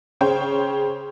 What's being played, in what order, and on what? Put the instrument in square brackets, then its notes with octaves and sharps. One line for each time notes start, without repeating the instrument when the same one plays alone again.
[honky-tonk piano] C#3 C5 C#5 G5